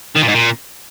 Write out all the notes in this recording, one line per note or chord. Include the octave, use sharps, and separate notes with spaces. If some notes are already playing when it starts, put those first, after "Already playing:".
D#3
A#2
G#2
A#2